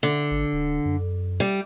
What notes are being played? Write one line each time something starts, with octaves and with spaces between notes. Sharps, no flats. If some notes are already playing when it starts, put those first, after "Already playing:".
D3
G#1
D1
F#2
G3